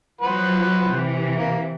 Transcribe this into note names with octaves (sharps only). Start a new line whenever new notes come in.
F3 F#3 B4 C5 F#5
C3 E3
A#3